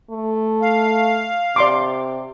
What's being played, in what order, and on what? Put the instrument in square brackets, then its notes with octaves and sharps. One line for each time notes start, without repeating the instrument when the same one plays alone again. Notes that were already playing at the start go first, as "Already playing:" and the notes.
[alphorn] A3
[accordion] F5
[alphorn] C3 [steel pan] D5 C6 D6